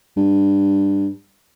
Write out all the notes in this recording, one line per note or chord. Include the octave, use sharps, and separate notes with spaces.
G2